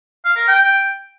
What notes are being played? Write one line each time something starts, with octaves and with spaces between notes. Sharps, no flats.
F5
A#4
G5